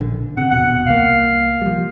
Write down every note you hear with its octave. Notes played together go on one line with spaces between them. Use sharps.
A#1 D3
C3 F#5
D#1 E2 B2 F#5
C2 A#3 F5
F3 G3